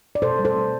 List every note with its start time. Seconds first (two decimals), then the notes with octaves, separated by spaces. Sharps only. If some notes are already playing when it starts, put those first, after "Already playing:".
0.15 D5
0.22 B2 A4 C5
0.39 G3
0.45 A4 C5
0.56 G3